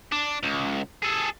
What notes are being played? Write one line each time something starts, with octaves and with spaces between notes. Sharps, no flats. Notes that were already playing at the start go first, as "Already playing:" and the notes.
D4
C#2
G#4 A4